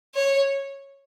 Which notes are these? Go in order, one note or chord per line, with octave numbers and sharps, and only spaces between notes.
C#5